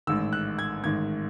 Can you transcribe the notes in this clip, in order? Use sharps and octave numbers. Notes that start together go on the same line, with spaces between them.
A1 G#2 D#3 E6
F#6
G#6
A1 G#2 D#3 G#6